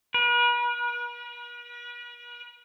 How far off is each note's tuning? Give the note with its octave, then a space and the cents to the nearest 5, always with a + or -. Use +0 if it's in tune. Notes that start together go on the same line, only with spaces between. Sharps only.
B4 -45